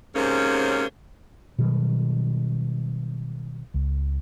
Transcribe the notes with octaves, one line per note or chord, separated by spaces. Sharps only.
G#2 C3 A#3 C#4
B2 D#3 F#3 G3
C#2